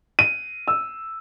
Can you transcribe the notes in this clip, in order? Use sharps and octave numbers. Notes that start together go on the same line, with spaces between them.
D#7
E6